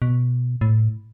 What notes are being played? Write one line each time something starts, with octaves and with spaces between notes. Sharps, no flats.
B2
A2